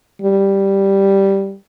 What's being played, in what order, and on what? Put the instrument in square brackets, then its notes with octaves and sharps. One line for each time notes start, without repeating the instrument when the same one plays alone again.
[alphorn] G3